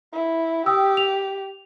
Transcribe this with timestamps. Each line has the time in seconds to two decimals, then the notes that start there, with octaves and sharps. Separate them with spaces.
0.13 E4
0.66 G4 G5 D#6 E6
0.97 F7